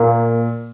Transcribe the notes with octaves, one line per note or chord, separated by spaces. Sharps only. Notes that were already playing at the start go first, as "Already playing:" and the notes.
Already playing: A#2 A#3